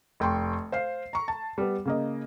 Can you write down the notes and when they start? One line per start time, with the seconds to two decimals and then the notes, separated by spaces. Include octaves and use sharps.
0.20 F1 G5 C6 C#6
0.72 C5 F5 C7
1.13 A#5 C#6
1.28 A5
1.58 G3 B3
1.85 C#3 A#3 D#5